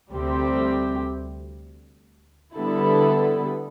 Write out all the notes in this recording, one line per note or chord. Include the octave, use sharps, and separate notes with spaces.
D2 C3 G3 C4 G4
D3 G3 B3 E4 A4